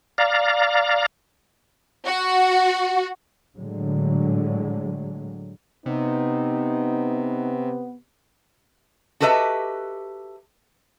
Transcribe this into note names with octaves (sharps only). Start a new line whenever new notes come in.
D5 F5 A#5
F#4
A2 D3 F#3 G#3
C3 B3 D#4
F#4 G4 A4 B4 D#5 E5